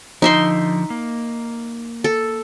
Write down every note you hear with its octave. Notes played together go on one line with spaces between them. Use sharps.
D3 F3 D#4 E5 C6
A#3
A4